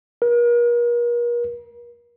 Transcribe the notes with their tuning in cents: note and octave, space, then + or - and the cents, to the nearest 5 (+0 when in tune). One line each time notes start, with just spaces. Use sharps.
A#4 +40